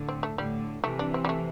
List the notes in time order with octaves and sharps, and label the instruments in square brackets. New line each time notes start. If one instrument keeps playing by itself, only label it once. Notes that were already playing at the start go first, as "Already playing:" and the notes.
Already playing: [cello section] A2 D3
[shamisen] C4
A3
[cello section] A2 D3 [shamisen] G3
[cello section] C3 E3 [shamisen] A3
[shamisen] D4
C4
G3
A3